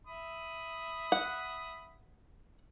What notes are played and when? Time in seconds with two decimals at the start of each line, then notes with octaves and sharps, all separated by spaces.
0.07 E5 B5 D#6
1.12 F#5